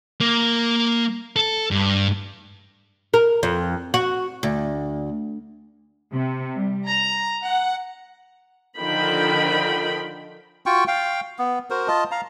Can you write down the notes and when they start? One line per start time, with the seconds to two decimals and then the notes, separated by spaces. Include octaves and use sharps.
0.21 A#3
1.36 A4
1.71 G2
3.14 A#4
3.43 F2
3.94 F#4
4.43 D2
6.10 C3
6.55 G3
6.90 A#5
7.45 F#5
8.79 D3 D#3 F3 D#4 G5 B5
10.66 F4 F#4 G5 C#6
10.88 F5 G5
11.39 B3
11.70 F#4 A#4 C5
11.88 F4 D#5 A5
12.11 F5 A#5